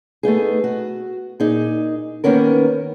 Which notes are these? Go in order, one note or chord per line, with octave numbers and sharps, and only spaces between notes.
A3 B3 D#4 G#4
F#4
A#2 D#4 G#4
D#3 A#3 B3 C#4 A#4